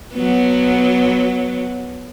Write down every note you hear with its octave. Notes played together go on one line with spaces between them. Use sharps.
F#3 B3